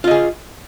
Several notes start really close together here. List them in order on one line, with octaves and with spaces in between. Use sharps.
F4 D#5 G#4